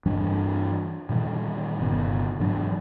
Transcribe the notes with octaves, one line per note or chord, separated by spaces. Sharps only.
G2 E3 G3 D4
A#2 D#3 E3 G3
G1 C3 B3
G#2 E3 F#3 D4